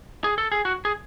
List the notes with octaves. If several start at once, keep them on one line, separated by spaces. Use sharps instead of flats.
G#4
A4
G#4
F#4
G#4